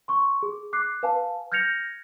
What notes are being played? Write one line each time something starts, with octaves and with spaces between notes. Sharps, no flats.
C6 C#6
G#4
D6 F#6 C7
B4 F5 G#5 A5
F6 G6 G#6 A#6 C#7 F7